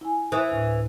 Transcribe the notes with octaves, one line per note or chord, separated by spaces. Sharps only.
E4 G#5
E3 D#6
D2 A2